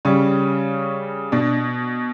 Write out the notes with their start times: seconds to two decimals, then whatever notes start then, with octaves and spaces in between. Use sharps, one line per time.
0.05 C#3 G3 C#4
1.32 B2 D4